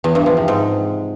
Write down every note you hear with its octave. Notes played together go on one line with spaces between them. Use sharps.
E2
G2
F3
C3
G#2